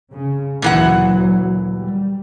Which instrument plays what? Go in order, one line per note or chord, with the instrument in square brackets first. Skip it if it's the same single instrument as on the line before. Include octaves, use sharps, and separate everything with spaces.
[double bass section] C#3
[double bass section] D2 F#3 [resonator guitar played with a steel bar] A#2 E3 F#5
[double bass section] G3